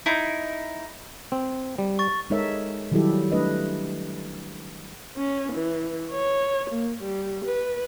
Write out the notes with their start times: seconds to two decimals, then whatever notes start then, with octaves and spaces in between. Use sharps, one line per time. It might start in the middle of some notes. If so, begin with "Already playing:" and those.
0.06 D#4 E4
1.32 C4
1.78 G3
1.99 C#6 A6
2.30 G#3 D#4 A4 A#4 C#5 E5
2.92 D#3 F#3 G3 E4 G4 A4
3.32 A3 D4 B4 D#5
5.16 C#4
5.53 E3
6.11 C#5
6.70 A#3
7.02 G3
7.45 B4